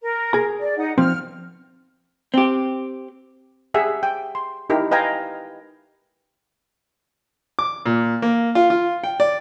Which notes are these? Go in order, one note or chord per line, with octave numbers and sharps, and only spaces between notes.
A#4
G#4 A#5
D5
D#4 F#5
F3 C4 F6
C4 G4
G4 G#4 E5 F#5
G5
C6
D#4 E4 G4 A#4
B4 D#5 F5 G5 G#5 A#5
D6
A#2
A#3
F4
F4
G5
D5